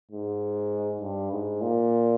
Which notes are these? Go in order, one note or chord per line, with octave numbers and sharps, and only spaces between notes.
G#2
G2
G#2
A#2